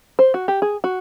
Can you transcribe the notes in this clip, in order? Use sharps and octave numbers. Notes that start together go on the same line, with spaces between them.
C5
F#4
G4
G#4
F#4